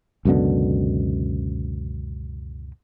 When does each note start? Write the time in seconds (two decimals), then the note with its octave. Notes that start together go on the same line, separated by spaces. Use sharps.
0.25 C#2 F#2 B2 D3